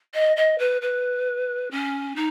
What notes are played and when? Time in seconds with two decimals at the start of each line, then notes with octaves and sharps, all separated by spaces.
0.14 D#5
0.36 D#5
0.58 B4
0.81 B4
1.71 C#4
2.16 D#4